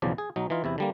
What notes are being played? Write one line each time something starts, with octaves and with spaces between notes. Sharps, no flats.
B1 E2 C#3 F3 D5
G#4
B1 F#3 D#4
E3 D#4 F4
E2 C3 E4
D3 G3 A#3